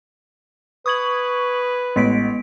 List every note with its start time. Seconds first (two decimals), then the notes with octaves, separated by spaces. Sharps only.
0.86 B4 C#6 D#6 G#6 F#7
1.96 A1 G#3 B3 B6 D7